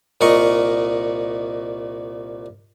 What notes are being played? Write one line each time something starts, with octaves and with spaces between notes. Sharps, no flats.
C2 A#2 A#4 D#5 C#6